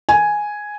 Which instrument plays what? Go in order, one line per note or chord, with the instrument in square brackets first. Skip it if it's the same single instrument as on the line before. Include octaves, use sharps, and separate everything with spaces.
[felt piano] G#5